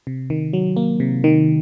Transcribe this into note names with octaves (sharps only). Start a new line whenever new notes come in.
C3
D#3
F#3
A#3
C3
D#3